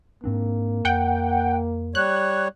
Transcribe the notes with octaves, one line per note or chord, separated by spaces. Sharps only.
G#2 A#3 C4 D4
F2 F#5 G5
G3 C#5 F#6